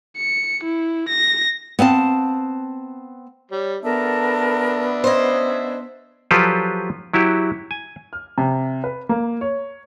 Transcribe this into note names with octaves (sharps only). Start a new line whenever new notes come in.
C#7
E4
A#6
B3 C4 F5 A5
G3 C#5
B3 D4 A4 A#4 E5 A5
C#4 C5 D#5
F3 F#3 F4 G4 A4 B4
F#3 E4 F#4 G4
G#5
F6
C3
B4
A#3
C#5